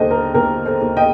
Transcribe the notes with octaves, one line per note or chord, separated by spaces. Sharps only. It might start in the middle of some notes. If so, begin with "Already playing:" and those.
Already playing: D#2 D3 A4 C5 D#5
A#4
D#2 A#4
A4 C5
D#2
D#5 G5